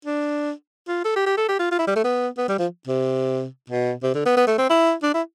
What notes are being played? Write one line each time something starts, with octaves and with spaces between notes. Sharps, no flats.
D4
F4
A4
G4
G4
A4
G4
F4
F4
E4
G3
A3
B3
B3
G3
F3
C3
B2
C3
D3
B3
B3
A3
C4
E4
D4
E4